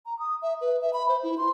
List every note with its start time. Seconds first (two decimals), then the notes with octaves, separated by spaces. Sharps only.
0.06 A#5
0.19 D#6
0.42 E5
0.61 B4
0.81 E5
0.93 B5
1.09 C5
1.23 E4
1.38 C6